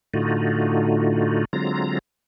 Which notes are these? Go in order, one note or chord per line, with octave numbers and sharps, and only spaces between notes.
A2 D3 A3 D#4 F4 F#4
D3 F#3 G#3 C4 F4 A#5